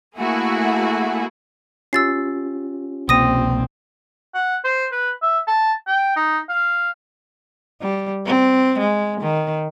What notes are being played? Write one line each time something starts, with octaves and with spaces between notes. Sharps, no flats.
A3 A#3 E4 F#4 G#4
C#4 F4 G4 E6 A6 C7
C2 B2 A#3 C4 D#6 A#6 D#7
F#5
C5
B4
E5
A5
G5
D#4
F5
G3
C4
G#3
D#3